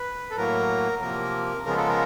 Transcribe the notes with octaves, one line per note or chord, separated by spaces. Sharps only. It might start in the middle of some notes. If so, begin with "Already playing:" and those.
Already playing: B4
A4
A2 F#3 A#3 A#4
C3 F3 A#3 A#4
C#3 F3 G#3 B3 A#4
A4
A#4